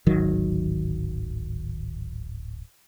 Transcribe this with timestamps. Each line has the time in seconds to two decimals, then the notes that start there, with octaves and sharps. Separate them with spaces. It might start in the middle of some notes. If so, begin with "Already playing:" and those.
0.06 D1 G#1 D#3 F#3